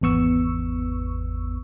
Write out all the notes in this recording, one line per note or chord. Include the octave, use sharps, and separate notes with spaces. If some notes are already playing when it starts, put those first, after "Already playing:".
G#1 E2 B3 C#6 E6